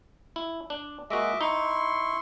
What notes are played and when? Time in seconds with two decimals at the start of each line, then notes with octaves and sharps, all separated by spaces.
0.36 E4
0.70 D4
1.10 G#3 A#3 F#4 D#5 E5 D6
1.41 D#4 E4 C6 C#6